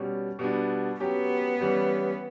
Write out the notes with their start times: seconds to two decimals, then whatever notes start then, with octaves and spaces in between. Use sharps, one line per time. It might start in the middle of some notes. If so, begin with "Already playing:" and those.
Already playing: B2 G3 C#4
0.39 B2 G3 B3 D4
1.00 F#3 B3 C#4 G4
1.61 E3 G3 C#4